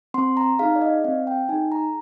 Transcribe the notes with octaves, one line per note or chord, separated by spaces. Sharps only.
C4 C6
A#5
D#4 G#4 F5
D5
D#5
C4 F5
G5
D#4 G#4 G#5
A#5